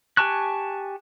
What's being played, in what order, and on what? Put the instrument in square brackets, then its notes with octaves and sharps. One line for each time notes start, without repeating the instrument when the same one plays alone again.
[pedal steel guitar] G4 G#5 A5 C#6 F#6